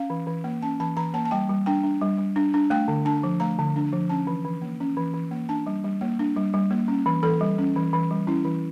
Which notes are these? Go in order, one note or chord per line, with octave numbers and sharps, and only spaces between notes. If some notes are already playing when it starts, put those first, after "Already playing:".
Already playing: C#4 F5
E3
E3
A#3
C#4 A5
E3 A5
E3 A#5
A#3 A5
A5
G3 G5
G3
D4 G5
D4
G3
G3
D4
D4
A3 G5
D3
D4 A5
F3
A3 A#5
D3
D4
F3
C#4 A5
E3
E3
A#3
C#4
E3
E3
A#3
D4 A5
G3
G3
A#3
D4
G3
G3
A#3
C#4
E3
E3 A4
G3
C#4
E3
E3
G3
C#4 E4
E3